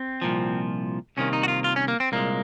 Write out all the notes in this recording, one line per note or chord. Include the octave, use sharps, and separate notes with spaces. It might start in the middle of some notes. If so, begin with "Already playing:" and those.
Already playing: C4
C2 A#2 F3
C2 C3 D#3 A#3 C#4
D#4
F#4
F4
F4
C#4
A#3
C4
C2 A#2 G#3 A#3